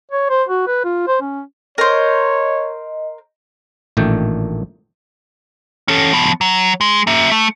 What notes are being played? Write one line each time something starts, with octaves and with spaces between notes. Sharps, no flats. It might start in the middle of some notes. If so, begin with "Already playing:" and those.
C#5
C5
F#4
B4
F4
C5
C#4
A#4 C5 C#5 D#5
A1 A#2 D#3 A3 D4 G5
C#4 A4
F3 B3
F#3
G#3
A#3 E5
A3